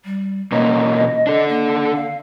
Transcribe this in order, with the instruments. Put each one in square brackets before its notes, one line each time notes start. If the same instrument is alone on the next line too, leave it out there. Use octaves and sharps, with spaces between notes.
[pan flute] G3
[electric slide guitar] B2 A#3 C#4 [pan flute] D#5
[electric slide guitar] D4 A4
[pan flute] A#3
F5